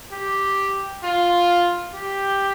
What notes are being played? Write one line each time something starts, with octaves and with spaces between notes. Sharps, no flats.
G4
F4
G4